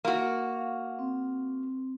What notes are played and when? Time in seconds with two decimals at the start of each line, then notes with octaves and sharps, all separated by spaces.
0.05 A#3 F#4
0.53 F5
0.99 C4